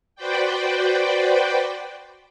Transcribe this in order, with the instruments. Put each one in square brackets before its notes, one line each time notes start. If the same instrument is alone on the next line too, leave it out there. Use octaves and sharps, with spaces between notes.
[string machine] F#4 B4 C5 D5 G5